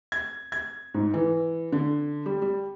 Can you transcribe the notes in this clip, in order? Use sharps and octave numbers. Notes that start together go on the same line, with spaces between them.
G#6
G#6
G#2
E3
D3
G3
G3